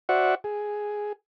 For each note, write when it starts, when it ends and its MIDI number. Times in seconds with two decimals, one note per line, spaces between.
0.09 0.35 66
0.09 0.35 72
0.09 0.35 74
0.09 0.35 76
0.09 0.35 78
0.09 0.35 85
0.44 1.13 68